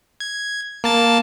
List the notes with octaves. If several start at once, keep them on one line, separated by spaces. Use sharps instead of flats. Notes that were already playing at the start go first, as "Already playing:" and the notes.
G#6
A#3 A5 A6